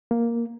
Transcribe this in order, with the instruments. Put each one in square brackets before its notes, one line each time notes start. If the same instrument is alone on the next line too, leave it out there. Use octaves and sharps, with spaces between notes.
[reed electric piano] A#3